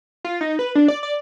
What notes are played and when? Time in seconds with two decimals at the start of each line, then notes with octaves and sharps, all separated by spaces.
0.24 F4
0.41 D#4
0.59 B4
0.75 D4
0.88 D5
1.03 D5